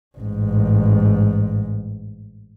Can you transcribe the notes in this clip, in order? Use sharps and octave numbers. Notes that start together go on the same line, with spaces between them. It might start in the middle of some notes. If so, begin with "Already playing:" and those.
A1 G#2